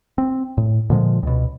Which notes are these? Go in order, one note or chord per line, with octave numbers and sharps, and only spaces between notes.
C4
A2
A#2 D3 F3 G#3
C#2 B2